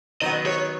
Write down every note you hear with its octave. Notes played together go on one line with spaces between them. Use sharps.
D#3 F#3 B3 D#5
C#5